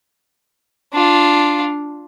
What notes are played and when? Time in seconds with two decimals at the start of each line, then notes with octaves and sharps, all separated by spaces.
0.93 D4 F4